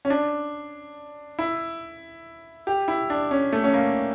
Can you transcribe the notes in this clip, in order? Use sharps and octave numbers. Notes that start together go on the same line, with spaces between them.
C#4
D4
E4
G4
E4
D4
C#4
A3
C#4
A#3